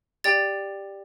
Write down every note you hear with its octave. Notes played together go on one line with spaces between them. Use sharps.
G4 D5 G5 A6